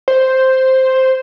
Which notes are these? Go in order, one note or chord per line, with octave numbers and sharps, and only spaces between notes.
C5